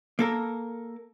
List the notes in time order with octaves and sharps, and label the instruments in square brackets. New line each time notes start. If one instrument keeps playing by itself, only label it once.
[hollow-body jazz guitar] A#3 A4 A#4